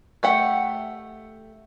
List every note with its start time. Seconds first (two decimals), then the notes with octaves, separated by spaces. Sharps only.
0.23 A3 G4 F#5